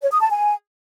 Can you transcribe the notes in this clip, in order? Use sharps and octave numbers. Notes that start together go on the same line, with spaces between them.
C#5
D#6
A5
G#5